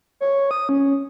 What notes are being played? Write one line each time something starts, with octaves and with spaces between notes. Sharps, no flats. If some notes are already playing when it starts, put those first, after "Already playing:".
C#5
D#6
C#4